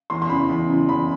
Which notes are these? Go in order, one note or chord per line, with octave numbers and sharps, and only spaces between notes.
E2 C6
C6
C#3 E3 B5
E2
C#3 E3
E2 B5